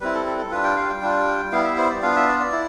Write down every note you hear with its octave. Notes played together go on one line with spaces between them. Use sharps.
G3 C4 E4 B4
A4
A4
A4
G3 D4 F4 B4
G5
F5
G5
G3 D4 F4
G3 B3 E4 F5
E5
C5
D5
B3 D4 F4 F5
E5
D5
D5
E4